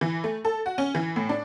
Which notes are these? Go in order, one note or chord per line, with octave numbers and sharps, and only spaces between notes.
E3
A3
A4
F#4
C#4
E3
A2
D4